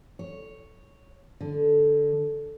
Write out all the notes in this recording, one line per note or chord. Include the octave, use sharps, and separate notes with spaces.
C#5
D3